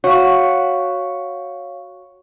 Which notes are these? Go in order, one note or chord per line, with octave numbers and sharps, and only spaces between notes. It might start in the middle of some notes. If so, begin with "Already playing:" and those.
F#4 C#5 F5